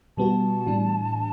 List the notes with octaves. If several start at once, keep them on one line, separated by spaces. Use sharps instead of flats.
B2 G3 B3 F#4 A5
A2 E3 G3 D4